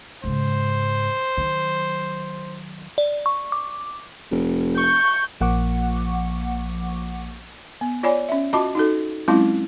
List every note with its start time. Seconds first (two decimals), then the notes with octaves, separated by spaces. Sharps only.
0.24 G#2 C#3 C5
1.38 D#3 F#3
2.98 D5
3.26 C#6
3.52 D6
4.31 F1
4.78 C#6 G6
5.41 A#1 F3 A#3 F#5 C#6 D6
7.81 B3
8.03 F4 C#5 D5 G#5 B5
8.29 C#4 E5
8.53 F4 F#4 D#5 A5 B5 D6
8.75 D#4 F#4 A4
9.28 F#3 G#3 C4 C#4 E4 F4